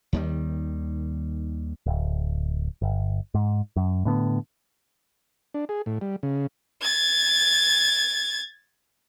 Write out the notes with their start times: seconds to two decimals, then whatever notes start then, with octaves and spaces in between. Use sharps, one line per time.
0.13 D#2 D#3 G3
1.86 D1
2.82 G1
3.34 G#2
3.76 F#2
4.05 A2 D3 B3
5.54 D4
5.69 G#4
5.86 A2
6.01 G3
6.23 C#3
6.81 G#6 A6